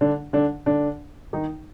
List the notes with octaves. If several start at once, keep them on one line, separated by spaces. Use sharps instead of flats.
D3 D4
D3 D4
D3 D4
D#3 D#4